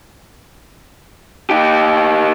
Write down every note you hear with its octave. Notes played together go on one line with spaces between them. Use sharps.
D#4 G4